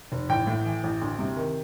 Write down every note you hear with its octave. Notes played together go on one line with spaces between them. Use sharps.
F1
A1 G5
A2
E3
A1
D2
C3
D#3